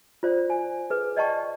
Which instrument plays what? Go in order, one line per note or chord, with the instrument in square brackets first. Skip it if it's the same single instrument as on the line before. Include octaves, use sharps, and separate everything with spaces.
[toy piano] F4 C5 D5
G#5
G#4 B4
D5 D#5 G5 A5 C#6